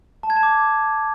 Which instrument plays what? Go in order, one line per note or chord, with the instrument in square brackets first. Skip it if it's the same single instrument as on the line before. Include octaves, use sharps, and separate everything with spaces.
[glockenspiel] A5
G#6
A5
D6